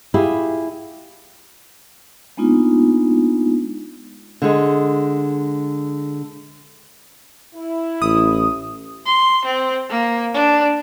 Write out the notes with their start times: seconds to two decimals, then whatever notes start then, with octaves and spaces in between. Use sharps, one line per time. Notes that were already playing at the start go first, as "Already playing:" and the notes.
0.14 E4 F4 G4 G#4
2.37 G#3 A#3 B3 D4 D#4 F4
4.42 D3 G#3
7.55 E4
8.02 A1 D#6
9.06 C6
9.46 C4
9.90 A#3
10.34 D4